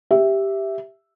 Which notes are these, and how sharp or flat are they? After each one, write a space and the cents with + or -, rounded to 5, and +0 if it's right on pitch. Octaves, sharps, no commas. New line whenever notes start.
G4 +0 E5 +0